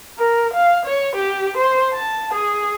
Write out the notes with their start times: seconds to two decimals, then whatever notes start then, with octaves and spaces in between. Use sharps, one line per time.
0.18 A#4
0.54 F5
0.86 C#5
1.16 G4
1.58 C5
1.94 A5
2.34 G#4